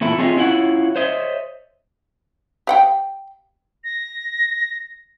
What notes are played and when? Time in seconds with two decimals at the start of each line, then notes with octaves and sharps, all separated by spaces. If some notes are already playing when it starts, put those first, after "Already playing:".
0.01 E2 A#2 A3 E4
0.18 C4 F4 G#4 C#5 D#5 E5
0.36 C#4 E4 F4 C#5 F#5
0.96 C5 C#5 D#5 E5
2.67 G4 F#5 G5
3.84 A#6